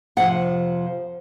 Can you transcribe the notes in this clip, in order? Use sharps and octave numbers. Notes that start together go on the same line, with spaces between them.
F2 C3 F3 F#5